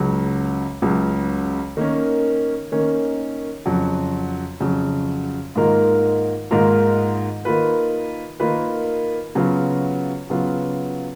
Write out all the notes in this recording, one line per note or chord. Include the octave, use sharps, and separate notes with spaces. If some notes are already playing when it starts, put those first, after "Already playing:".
Already playing: C#2 C#3 F#3
C#2 C#3 F#3
D#3 A#3 C#4
D#3 A#3 C#4
F2 C#3 F#3
F2 C#3 F#3
G#2 D#3 A#3 F4 A#4
G#2 D#3 A#3 F4 A#4
D#3 A#3 F4 B4
D#3 A#3 F4 B4
C#3 F#3 B3 F4
C#3 F#3 B3 F4